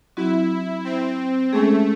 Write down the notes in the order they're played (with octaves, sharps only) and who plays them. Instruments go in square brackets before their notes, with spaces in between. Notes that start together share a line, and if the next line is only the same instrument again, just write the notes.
[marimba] F#3 C4 F#4 [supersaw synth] E4
[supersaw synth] C4
[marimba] G#3 C#4 G#4 [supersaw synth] A3